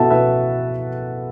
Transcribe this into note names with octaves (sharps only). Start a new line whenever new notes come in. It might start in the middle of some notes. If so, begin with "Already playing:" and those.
Already playing: B2 B3 E4 F#4 A4 E5 A5
B2 B3 E4 B4 E5